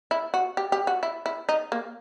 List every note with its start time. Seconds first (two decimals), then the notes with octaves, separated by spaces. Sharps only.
0.11 E4
0.34 F#4
0.57 G4
0.72 G4
0.87 F#4
1.03 E4
1.26 E4
1.49 D#4
1.72 A#3